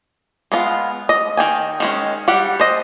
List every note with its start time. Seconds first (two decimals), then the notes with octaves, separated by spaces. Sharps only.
0.52 G#3 B3 F4
1.09 D#5
1.37 D#3 G5 G#5
1.80 D#3 G#3 C#4
2.28 G3 G4 F#5
2.60 C5 D#5